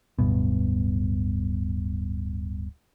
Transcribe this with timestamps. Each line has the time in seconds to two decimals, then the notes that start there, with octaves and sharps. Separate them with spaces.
0.19 D1 G2 B2